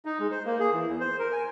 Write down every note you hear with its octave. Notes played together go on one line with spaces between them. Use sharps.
D#4
G#3
C5
A#3
G#4
E3
E2
C5
A#4
G#5